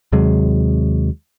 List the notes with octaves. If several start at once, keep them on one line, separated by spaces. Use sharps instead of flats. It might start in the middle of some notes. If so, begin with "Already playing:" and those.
D#2 C3 F#3 G#3